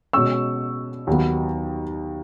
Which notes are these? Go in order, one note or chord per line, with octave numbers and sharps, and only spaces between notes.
B2 G#3 C#4 C#6 E6
D#2 D#3 F#3 B3